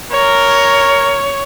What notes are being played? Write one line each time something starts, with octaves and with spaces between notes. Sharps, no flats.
A#4 C#5